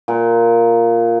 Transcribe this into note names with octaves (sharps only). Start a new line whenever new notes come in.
A#2